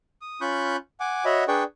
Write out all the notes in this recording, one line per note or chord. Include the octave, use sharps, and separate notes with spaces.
D#6
C#4 F4 B5 C#6 F#6 G6
F#5 G#5 D6
F#4 C#5 D#5 E5 F#5 B5
D4 G#4 B4 D5 G5 C#6